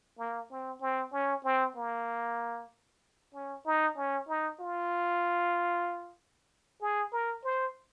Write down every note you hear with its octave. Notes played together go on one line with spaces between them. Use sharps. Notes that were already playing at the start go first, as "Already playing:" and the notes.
A#3
C4
C4
C#4
C4
A#3
C#4
D#4
C#4
D#4
F4
G#4
A#4
C5